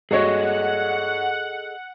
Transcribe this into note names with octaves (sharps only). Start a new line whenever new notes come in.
G2 F#4 G#4 A4 C#5 D#5 F#5